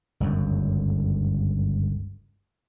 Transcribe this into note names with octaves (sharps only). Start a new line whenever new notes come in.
G1 C#2 F#2